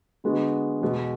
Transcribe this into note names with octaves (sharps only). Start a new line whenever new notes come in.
D3 G#3 B3 F#4
E2 B2 G#3